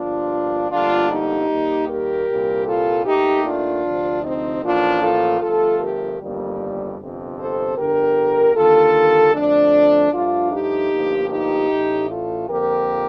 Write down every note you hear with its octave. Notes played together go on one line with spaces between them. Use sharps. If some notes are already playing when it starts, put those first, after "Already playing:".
Already playing: G1 G2 F3 A#3 D4 F4
G1 F2 D3 G3 A#3 D4 F4
D#4 G4
D#2 D#3 G3 A#3
G4 A#4
C2 A#2 G3 A#3
F4 A4
D#2 D#3 A3 D#4 G4
D4 F4
D2 C3 F3
C4 D#4
A1 A2 F3 A#3 D4 F4
F4 A4
G1 G2 F3 A3 F4 A4
G4 A#4
G1 F2 D#3 G3 A#3
G1 F2 C3
A4 C5
G1 F2 D3 G4 A#4
D#2 D3 G3 A#3 F4 A4
F2 D3 F3 A3 D4
G2 F3 A3 D4 F4
D#4 G4
G1 G2 F3 A#3
D#4 G4
A1 A2 A3
F4 A4
F2 D3 F3 A#3 G4 A#4